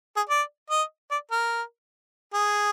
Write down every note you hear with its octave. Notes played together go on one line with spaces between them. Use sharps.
G#4
D5
D#5
D5
A#4
G#4